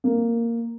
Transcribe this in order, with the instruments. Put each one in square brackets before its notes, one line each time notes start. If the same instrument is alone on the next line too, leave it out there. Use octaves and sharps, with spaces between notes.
[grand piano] A#3